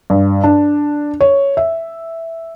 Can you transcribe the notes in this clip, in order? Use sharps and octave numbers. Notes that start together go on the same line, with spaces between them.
G2
D4
C#5
E5